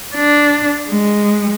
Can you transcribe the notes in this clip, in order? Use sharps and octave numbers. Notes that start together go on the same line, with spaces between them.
D4
G#3